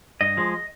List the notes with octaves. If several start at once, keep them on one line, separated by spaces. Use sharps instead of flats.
G2 D#5
F3 G#3